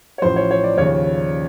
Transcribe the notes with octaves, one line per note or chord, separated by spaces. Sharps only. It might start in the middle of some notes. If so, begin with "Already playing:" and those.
C#5
A1 A2 F3 C5
C#5
C#5
D5
D#2 C#3 F3 C#5